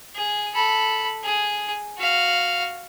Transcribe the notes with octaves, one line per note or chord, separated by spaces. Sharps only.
G#4
A4 B5
G#4
F#4 F5